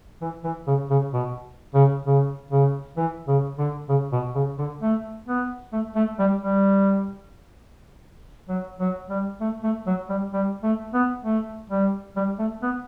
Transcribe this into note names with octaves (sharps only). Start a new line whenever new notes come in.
E3
E3
C#3
C#3
B2
C#3
C#3
C#3
E3
C#3
D3
C#3
B2
C#3
D3
A3
B3
A3
A3
G3
G3
F#3
F#3
G3
A3
A3
F#3
G3
G3
A3
B3
A3
G3
G3
A3
B3